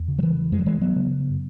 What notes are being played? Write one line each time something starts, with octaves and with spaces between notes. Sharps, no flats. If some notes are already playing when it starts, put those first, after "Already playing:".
Already playing: E2
C#3
F#3
E3
F#2 G#3
F#3
E3 G#3
F#3 B3
C#3